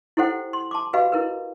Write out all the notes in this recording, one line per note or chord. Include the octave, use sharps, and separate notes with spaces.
E4 G4 A4 C5 F#5 G5
C6
A5 C6 D6
F#4 G4 B4 D#5 F5 B5
E4 A#4 B4